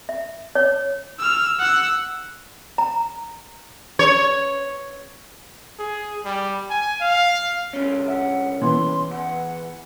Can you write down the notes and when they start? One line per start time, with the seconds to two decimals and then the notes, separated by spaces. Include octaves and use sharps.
0.09 E5
0.55 C#5
1.19 E6 F6
1.59 F#5 E6
2.78 A#5
3.99 C#5
5.79 G#4
6.25 G3
6.70 G#5
7.01 F5
7.73 C2 F2 C#4
8.08 E5 F#5
8.62 E3 B3 C6
9.11 E2 F#5